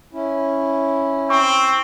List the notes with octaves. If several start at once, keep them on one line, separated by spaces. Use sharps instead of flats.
C#4 E4
C4 C#6